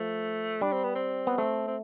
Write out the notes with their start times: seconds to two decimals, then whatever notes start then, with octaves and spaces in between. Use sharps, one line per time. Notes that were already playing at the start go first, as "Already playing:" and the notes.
Already playing: F3 A3
0.61 G3 D4
0.72 C4
0.84 B3
0.95 C4
1.27 B3
1.38 A3 C4
1.67 C4